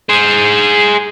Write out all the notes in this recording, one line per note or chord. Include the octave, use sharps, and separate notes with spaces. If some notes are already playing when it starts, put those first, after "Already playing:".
G#4 C5